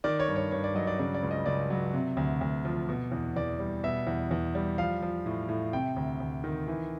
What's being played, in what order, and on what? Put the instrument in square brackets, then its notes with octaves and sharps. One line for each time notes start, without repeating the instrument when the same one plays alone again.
[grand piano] D#3 D5
C#5
G2
C#5
G2 C#5
D5
F#3 D#5
D5
C#3 D5
D5
C#2
D#5
C#2 D5
F#3
C3
D2
D2
F3
B2
E2
E2 D5
G3
B2 E5
E2
E2
G3
F3 F5
F3
A2
A2
C3 G5
D2
D2
D#3
E3